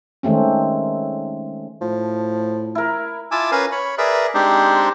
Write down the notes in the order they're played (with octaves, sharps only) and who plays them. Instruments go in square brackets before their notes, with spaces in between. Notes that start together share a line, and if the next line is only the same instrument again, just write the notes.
[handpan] D#3 G#3 A3 C4 C#4
[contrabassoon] A2 [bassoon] F3
[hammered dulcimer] E4 A#4
[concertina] E4 F4 G#5 A5 D6 E6
C#4 A#4 B4 F5 G#5
C#5 B5
G#4 A#4 B4 D5 E5
G#3 C4 D4 D#4 G4 C5